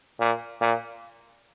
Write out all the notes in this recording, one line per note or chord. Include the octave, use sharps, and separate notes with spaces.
A#2
A#2